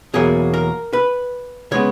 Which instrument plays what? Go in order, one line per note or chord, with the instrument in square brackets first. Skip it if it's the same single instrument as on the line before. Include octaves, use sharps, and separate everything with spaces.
[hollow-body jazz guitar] E2 B2 F#3 A#3 G#4
A#4
B4
C#3 G#3 B3 C#5